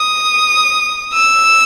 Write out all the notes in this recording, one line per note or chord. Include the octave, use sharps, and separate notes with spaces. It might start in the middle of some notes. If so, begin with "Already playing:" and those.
Already playing: D#6
E6